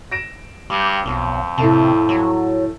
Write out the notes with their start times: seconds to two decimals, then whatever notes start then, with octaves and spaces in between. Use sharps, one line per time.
0.12 A#6 D7 E7
0.70 G2 G3
1.06 B1 F2
1.58 A2 C3 A3 A5
2.09 F#3